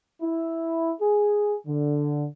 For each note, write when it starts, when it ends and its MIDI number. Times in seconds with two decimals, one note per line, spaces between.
0.22 0.93 64
1.01 1.55 68
1.67 2.27 50